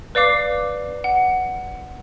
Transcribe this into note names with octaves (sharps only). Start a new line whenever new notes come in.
B4 D5 F5 D6 C7
F#5